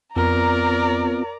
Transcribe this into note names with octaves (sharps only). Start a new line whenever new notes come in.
F2 B3 C4 F4 A#4 D5 A#5